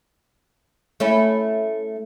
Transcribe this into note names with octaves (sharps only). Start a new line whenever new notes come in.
A3 C#4 E4